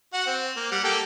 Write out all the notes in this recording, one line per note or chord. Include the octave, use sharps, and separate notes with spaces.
F#4 F#5
C4
A#3
G3 F#5
A#3 G4 A4